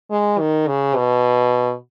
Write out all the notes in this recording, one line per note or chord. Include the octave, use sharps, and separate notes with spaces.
G#3
D#3
C#3
B2